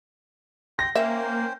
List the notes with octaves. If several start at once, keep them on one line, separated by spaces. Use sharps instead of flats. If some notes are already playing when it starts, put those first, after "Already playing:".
G5 C6 A#6
A#3 C#4 C5 E5 G5